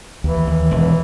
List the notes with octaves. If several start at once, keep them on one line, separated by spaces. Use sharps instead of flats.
D#2 E3
D#2
E1